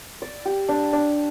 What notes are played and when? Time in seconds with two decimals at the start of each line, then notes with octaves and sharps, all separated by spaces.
0.22 D5
0.45 G4
0.69 D4
0.93 D4